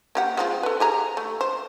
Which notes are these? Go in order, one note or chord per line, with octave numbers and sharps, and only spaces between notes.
A#3 G4 F#5
G#3 C4 F4
A4 B4
G4 G#4 A#5
A3
C5